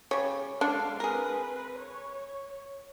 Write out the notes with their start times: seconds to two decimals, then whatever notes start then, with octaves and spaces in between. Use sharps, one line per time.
0.11 C#3 G3 C#5
0.61 D3 G#3 D4 A4 F5
1.00 C4 G#4 A#4 B4
1.80 C#5